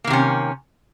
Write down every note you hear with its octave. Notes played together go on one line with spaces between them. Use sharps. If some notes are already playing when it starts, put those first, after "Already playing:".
C3 D#3 A#3 C#4